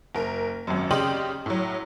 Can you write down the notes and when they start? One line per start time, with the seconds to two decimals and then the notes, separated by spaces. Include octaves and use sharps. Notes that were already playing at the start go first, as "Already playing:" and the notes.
0.15 F#1 A#4
0.67 G#1 F#2
0.91 C#3 G4 D5 D#5 C6 F#7
1.46 A2 F#3